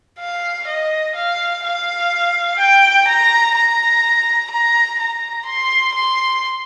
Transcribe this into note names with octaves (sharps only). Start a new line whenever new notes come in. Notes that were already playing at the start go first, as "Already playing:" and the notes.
F5
D#5
F5
F5
G5
A#5
A#5
A#5
A#5
C6
C6